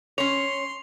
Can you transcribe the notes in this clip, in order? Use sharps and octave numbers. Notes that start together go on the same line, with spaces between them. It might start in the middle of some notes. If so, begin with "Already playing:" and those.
C#4 C#5 C6 F7